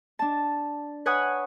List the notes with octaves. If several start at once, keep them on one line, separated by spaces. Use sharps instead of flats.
D4 A5
B4 C#5 F#5 G#5 D#6 F#6